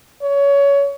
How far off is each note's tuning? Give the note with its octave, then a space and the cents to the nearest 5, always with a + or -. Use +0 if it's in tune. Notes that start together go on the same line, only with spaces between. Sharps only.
C#5 +20